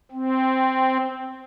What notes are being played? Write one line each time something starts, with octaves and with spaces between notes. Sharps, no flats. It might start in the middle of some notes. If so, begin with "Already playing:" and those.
C4